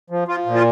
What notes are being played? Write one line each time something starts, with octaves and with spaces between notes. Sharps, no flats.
F3
F3 F4
A#2
F4